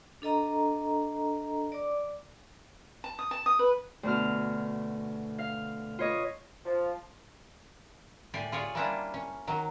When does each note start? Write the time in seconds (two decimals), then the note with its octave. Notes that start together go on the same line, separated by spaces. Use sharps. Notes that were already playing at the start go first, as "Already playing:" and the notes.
0.22 D4 A4 D#5 A#5
1.72 D5 D6
3.04 A5
3.19 D#6
3.31 A5
3.46 D#6
3.59 B4
4.03 D2 B2 F6
5.39 F5
5.99 F4 B4 C#5 D#5
6.65 F3
8.34 A2 G4 D5 G#5
8.52 F4 G#4 C#5 D5
8.75 G3 A#3 C#4 D4 E4 F4
9.14 C#4
9.47 D#3 F#3